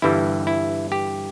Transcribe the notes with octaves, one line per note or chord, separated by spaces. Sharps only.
G1 G2 E3 G3 E4
E4
G4